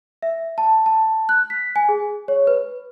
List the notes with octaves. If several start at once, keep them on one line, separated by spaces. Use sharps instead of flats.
E5
A5
A5
F#6
B6
G#5
G#4
C#5
B4